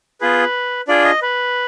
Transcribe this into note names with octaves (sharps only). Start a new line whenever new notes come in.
B3 F4 G#4 B4
D4 F4 G#4 D5
D#5
B4